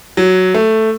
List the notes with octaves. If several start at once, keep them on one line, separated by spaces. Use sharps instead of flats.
F#3
A3